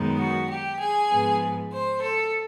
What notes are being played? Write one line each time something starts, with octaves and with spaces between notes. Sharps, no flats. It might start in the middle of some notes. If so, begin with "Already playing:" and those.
Already playing: F#2 D#3 G#3 B3 D#4
F#4
G4
G#4
G#2 F3 G#3 B3
C5
A4